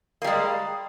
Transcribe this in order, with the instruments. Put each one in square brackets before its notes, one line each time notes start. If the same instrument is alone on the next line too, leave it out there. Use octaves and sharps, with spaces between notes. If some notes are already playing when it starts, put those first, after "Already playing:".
[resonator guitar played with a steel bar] A#3
G3
G#3